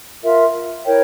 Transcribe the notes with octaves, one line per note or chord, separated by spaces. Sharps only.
F4 A#4 E5
E4 A#4 C#5 G5